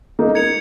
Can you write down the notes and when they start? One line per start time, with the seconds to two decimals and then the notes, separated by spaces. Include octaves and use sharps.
0.19 A#3 D#4
0.35 G#6 C#7 F7